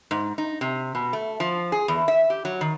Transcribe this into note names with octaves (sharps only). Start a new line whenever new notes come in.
G#2
D#4
C3
B2
A3
F3
G#4
E2
E5
G4
F#3
D#3